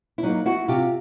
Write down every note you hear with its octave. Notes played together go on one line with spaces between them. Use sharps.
E4
F#3 A#3 D#4
E4 F#4
C3 F4 G4